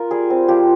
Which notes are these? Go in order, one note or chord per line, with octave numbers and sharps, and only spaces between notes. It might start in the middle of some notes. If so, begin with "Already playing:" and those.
Already playing: F4 A#4
G3 G#4
C4
F3 G4